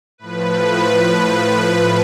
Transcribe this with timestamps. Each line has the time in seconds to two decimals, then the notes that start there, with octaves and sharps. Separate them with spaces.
0.18 A2 F3 B4
0.91 A2 F3
1.63 A2 F3